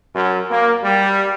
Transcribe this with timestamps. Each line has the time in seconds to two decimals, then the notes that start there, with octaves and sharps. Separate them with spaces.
0.15 F#2
0.51 A#3
0.84 G3